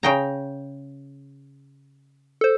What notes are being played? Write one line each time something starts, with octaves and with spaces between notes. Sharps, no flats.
C#3 G5 A#5
A4 C5